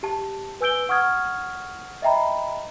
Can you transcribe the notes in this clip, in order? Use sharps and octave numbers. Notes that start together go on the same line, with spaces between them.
G4 A5
B4 G#5 E6 G6 D7 G7
F#5 C#6 D#6 F6 G#6
D#5 E5 G5 A#5 B5